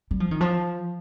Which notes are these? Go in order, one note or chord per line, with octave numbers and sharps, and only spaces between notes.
G3
F3
D#3
F3